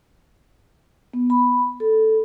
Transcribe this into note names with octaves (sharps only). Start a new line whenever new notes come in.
B3
B5
A4